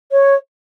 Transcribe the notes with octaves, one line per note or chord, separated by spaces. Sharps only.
C#5